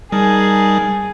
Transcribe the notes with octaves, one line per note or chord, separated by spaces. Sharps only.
G3 D#4 G#4 A#4 A5